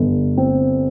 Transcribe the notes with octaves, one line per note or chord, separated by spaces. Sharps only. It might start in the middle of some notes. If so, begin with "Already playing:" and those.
Already playing: G1
C4